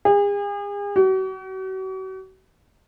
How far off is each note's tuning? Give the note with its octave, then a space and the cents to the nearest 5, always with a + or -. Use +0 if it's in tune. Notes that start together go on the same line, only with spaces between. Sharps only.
G#4 -40
F#4 +40